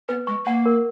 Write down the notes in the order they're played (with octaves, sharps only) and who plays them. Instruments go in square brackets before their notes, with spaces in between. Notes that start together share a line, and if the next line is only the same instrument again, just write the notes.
[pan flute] B3 [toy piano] B4
[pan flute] G#3 [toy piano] C#6
[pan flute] A#3 [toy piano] F#5
[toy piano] A#4